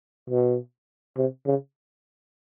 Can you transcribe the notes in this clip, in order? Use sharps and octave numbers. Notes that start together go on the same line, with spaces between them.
B2
C3
C#3